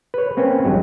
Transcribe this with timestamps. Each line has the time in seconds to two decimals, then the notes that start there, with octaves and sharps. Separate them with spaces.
0.14 B4 C#5
0.37 A#3 C4 C#4 B4
0.64 G#1 G2 F#3 G#3